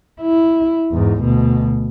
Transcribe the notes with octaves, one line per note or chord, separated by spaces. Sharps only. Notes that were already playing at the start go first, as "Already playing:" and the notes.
E4
E2 G#2
D2 B2